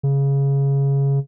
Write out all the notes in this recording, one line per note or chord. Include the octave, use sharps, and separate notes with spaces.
C#3